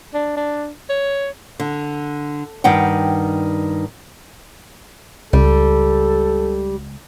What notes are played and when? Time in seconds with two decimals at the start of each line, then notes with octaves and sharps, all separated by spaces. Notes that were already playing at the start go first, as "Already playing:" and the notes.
0.14 D4
0.37 D4
0.89 C#5
1.60 D3
2.64 G2 D#3 F#5 G5
5.33 C#2 G3 A4